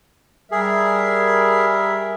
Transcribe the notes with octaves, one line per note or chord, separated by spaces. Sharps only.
G3 G#4 A#4 E5